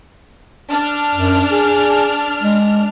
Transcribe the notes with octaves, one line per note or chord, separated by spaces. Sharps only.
D4 F6
F#2
G#4
G#3